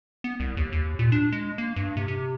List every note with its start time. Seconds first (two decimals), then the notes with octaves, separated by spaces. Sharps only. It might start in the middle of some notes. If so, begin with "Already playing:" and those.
0.24 B3
0.40 C2
0.57 D#2
0.72 D#2
0.99 A#2
1.12 D4
1.32 G#3
1.58 A#3
1.76 G2
1.97 C3
2.08 C3